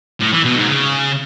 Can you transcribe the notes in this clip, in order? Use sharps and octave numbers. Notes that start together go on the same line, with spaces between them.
A2
E3
B2
G#2
C#3